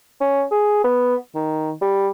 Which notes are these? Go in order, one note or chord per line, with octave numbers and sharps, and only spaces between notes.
C#4
G#4
B3
D#3
G3